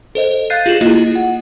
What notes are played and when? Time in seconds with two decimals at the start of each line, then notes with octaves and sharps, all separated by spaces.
0.15 A4 C5 D#5
0.50 F5 F#6 G6 A6 C7 D#7
0.66 F4 G4 G#4 E7 F#7
0.81 A#3 E4 F4 D#5
1.16 F#5